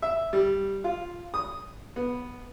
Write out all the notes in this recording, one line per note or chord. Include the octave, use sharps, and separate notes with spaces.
E5
G3
F4
D#6
B3